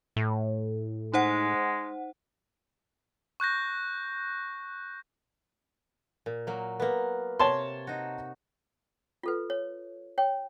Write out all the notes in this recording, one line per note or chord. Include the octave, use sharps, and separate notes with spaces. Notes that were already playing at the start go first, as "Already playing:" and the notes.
A2
G#3 D#4 C5 F#5
C#6 F#6 G6 A#6
A#2
F#3 A#3
A#3 B3
C3 C#5 A5 C6
D#4 F#4
F4 A4 B4
C#5
C#5 G5